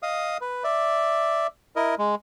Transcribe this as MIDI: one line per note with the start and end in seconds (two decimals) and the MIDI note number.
0.03 0.37 75
0.03 0.37 77
0.03 0.37 87
0.41 0.64 71
0.64 1.47 74
0.64 1.47 76
1.76 1.95 64
1.76 1.95 70
1.76 1.95 75
1.98 2.15 56